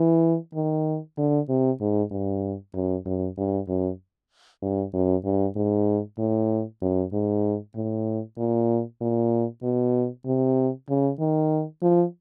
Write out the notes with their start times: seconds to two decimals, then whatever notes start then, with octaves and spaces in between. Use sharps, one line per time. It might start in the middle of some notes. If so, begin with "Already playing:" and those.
Already playing: E3
0.54 D#3
1.18 D3
1.49 C3
1.81 G#2
2.11 G2
2.74 F#2
3.06 F#2
3.37 G2
3.68 F#2
4.62 G2
4.94 F#2
5.24 G2
5.56 G#2
6.19 A2
6.82 F#2
7.13 G#2
7.76 A2
8.38 A#2
9.01 A#2
9.63 B2
10.26 C3
10.89 C#3
11.20 D#3
11.82 F3